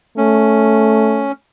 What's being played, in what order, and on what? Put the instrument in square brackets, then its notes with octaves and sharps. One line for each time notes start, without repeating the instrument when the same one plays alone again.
[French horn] A3 [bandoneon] C#4